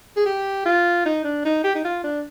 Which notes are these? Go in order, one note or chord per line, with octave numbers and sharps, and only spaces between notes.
G#4
G4
F4
D#4
D4
D#4
G4
D#4
F4
D4